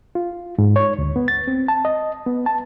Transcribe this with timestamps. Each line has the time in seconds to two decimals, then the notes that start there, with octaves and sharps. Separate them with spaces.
0.15 F4
0.58 G#2
0.76 C#5
0.99 D2
1.16 B3
1.28 A6
1.48 C4
1.68 A5
1.85 D#5
2.27 B3
2.46 A5